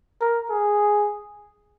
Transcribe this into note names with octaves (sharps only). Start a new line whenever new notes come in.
A#4
G#4